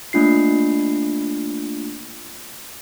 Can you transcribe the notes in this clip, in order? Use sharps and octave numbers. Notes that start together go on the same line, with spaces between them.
A3 A#3 D4 F4 C7